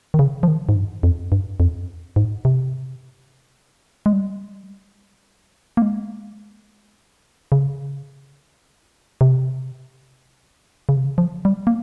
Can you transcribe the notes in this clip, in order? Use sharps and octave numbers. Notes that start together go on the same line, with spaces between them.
D#3
C#3
F3
D#3
G#2
G2
F2
G2
F2
G#2
C3
G#3
G3
A#3
G#3
C#3
C3
C#3
C3
C#3
F3
G3
A#3